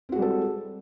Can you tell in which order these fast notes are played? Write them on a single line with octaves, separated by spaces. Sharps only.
C4 F#4 G#3 G3 A4